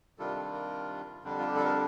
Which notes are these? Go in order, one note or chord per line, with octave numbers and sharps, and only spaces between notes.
C3 D#3 G3 D4 F4 A4
A4
A#4
F2 D3 G3 D4
F4
G4
A4
A#4